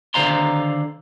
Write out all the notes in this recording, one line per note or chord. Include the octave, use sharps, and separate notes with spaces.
D3 D#3 C5 F5 A#5 C6